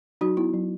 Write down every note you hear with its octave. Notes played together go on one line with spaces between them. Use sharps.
F#3 D#4 F#4
B3 E4
F#3